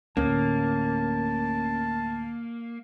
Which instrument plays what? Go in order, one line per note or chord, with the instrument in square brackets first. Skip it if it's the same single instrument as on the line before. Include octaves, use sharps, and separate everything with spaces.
[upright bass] D2 A2 [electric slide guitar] A#3 [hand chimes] C#4 [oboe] A5